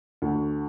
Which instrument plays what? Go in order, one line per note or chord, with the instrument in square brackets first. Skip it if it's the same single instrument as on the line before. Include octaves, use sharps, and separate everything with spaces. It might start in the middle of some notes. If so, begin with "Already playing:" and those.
[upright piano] D2